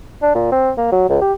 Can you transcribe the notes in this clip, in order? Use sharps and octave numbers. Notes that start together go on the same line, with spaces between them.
D4
A#2
C4
A#3
F#3
C#2
G4